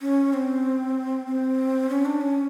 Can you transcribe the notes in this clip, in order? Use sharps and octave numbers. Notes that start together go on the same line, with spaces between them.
C#4
C4
C4
C#4
D4
C#4